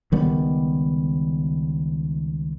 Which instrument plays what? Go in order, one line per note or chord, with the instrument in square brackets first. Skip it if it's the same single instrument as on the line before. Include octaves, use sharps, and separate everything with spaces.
[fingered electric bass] C#2 D#3 G3 B3